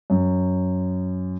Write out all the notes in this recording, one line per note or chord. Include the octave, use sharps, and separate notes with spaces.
F#2